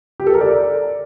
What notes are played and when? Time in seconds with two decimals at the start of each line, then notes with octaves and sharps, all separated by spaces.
0.20 G4
0.27 A4
0.34 A#4
0.41 D5